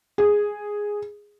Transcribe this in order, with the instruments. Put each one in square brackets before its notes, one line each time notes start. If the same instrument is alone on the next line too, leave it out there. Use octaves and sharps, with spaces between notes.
[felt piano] G#4